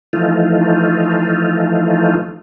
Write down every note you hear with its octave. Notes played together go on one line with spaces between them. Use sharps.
E3 F3 A3 D#4 F4